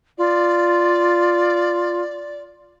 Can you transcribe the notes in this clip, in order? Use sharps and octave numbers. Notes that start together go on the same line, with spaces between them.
F4 D5